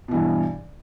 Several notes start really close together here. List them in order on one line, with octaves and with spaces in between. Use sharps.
B2 E3 G2